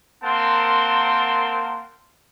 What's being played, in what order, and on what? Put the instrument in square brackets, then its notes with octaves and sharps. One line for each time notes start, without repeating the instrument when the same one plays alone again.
[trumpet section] A#3 C4 A#4 F#5 A5 C6